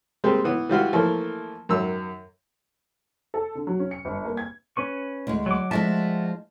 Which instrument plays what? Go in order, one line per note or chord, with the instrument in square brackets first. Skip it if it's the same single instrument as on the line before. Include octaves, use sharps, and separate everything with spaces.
[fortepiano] G3 G#3 A#3 C4
E3 B3
E3 G3 F4 F#4
E3 F3 A3 A#3
F#2 D#3 E6
[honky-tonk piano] A4
D3
F#3
C#4
C#7
G1
A#3
G#6
[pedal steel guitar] C#4 B4 C#6
[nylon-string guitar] D2 G#3
[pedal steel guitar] F#3 D6
[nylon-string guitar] F3 G#3 D4 [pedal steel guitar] F#4 E5 A5